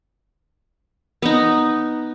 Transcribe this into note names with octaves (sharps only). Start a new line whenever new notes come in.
B3 D#4